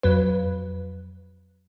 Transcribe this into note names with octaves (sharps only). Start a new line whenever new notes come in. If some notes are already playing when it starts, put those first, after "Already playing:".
F2 F#3 B4